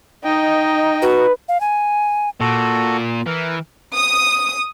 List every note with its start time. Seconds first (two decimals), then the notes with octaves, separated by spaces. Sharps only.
0.24 D#4 D#5 G5
1.02 F#4 B4
1.49 F5
1.61 G#5
2.40 A#2 F#4 A4
3.27 E3 A#4
3.95 D#6